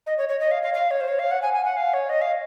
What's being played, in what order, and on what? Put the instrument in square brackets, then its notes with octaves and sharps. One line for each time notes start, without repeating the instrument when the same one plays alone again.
[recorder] D#5
C#5
C#5
D#5
F5
F5
F5
C#5
C5
C#5
F5
F#5
G#5
G#5
F#5
F5
C#5
D#5
F5